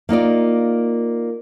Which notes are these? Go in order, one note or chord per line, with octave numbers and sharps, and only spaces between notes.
A#3 D#4 F4 D5